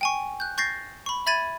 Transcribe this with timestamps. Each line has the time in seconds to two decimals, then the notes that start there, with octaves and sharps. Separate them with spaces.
0.01 G5 G#5 C#6
0.40 F#6 G6
0.58 C#6 G6 A6 A#6 C7
1.06 B5 C#6
1.26 E5 B5 G#6 A6 D#7